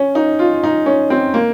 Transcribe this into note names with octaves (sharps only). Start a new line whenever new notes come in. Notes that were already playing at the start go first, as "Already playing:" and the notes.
Already playing: C#4
D#4
F4
D#4
C#4
C4
A#3